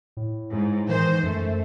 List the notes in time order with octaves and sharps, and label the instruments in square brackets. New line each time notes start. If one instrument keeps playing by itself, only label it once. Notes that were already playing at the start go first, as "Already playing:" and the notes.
[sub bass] A2
[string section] G#2
[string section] D#3 C5 [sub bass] E3
[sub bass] F#2 [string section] A3